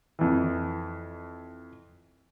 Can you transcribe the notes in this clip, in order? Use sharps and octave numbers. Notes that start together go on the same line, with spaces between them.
F2 E3